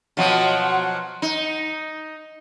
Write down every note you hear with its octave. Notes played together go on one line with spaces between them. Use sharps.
B2 F3 F#3
D#4